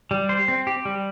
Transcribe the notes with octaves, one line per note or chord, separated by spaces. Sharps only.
G3
C5
C4
G4
G3